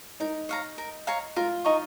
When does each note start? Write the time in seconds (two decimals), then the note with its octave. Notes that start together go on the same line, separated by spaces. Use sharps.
0.20 D#4 A#4
0.49 C#5 F5 A#5
0.78 A#4
1.07 C#5 F5 A#5
1.36 F4 A#4
1.65 D#4 D#5 A#5 C#6